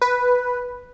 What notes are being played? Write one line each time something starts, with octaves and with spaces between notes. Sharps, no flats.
B4